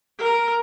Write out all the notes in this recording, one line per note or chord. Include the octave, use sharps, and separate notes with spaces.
A#4